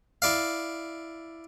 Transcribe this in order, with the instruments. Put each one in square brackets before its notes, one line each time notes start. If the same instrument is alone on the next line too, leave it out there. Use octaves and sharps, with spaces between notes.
[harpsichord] E4 D5 F5